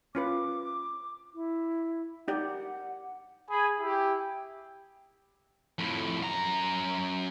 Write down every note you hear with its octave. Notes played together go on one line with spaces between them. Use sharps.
C#4 F4 B4 D6
E4
D#4 G4 D5 F#5
G#4 G#5 B5
E4 G4
F2 A2
F#2 A#5